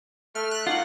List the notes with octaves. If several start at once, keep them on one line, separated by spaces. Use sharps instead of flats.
A3 F6
F#6
A#3 D#4 F4 F#5